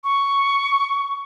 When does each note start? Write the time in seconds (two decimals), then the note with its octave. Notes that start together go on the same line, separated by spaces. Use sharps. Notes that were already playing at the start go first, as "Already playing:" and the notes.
0.04 C#6